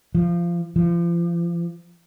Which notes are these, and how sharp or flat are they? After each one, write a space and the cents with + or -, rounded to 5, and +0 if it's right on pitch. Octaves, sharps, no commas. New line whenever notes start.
F3 -20
F3 -35